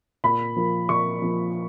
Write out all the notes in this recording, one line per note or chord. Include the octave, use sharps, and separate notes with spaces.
A#2 B5
F3 A#3
A#2 C#6
F3 A#3